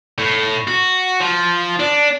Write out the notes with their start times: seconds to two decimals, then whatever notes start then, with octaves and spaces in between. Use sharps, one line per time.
0.18 A2
0.68 F#4
1.20 F3
1.79 D4